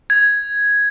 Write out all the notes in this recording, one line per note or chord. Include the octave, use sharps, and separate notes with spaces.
G#6